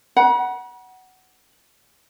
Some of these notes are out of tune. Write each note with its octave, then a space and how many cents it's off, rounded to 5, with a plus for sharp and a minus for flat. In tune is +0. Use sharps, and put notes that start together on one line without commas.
F#5 +15 B5 -45